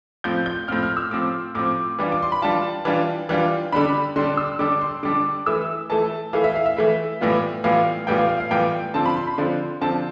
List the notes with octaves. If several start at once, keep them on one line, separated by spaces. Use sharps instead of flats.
A2 F3 C4 G6
G6
A2 F3 C4 F6
F6
E6
A2 F3 C4 D6
A2 F3 C4 D6
E3 G3 D4 F4
D6
C6
B5
E3 G3 D4 F4 A5
E3 G3 D4 F4
E3 G3 D4 F4
D3 G3 D4 B5
D3 G3 D4 C6
E6
D3 G3 D4 D6
C6
D3 G3 D4 D6
E3 A3 E4 E6
E3 A3 E4 A5
E3 A3 E4 F5
E5
F5
E5
E3 A3 E4
A2 E3 G3 B3 F4
A2 E3 G3 B3 F4 F5
A2 E3 G3 B3 F4 G5
F5
F5
F5
A2 E3 G3 B3 F4 G5
D3 F3 C4 F4 A5
B5
C6
B5
D3 F3 C4 F4
D3 F3 C4 F4 A5